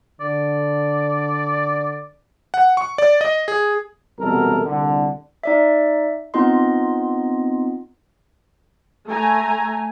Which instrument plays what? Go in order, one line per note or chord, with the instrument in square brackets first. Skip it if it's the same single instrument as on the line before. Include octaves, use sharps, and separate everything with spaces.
[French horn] D3 [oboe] D5
[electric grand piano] F#5
C#6
D5
D#5
G#4
[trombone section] C2 F#2 B2 E3 A4 A#4
C2 D3
[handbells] D#4 D5 E5
B3 C4 D#4 F4 D#5 C6
[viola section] A3 G#5 A#5